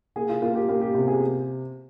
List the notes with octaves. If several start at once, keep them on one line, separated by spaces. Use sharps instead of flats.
A#3 G#4
F4
A#3 F4
G4
A#3 G4
G4
C3 G4
G#4